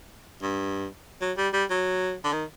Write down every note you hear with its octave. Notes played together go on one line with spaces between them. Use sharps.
G2
F#3
G3
G3
F#3
D3
D#3